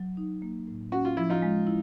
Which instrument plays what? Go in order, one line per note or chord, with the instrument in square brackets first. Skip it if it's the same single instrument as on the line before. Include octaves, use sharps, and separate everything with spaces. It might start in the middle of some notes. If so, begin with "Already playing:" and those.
Already playing: [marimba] F#3
D#4
A#3
A2
[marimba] C#4 [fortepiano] F#4
[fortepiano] F4
[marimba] F3 [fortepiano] E4
[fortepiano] D#4 F4
[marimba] G#3
E4